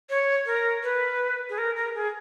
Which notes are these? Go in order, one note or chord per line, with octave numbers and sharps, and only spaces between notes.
C#5
A#4
B4
G#4
A#4
A#4
G#4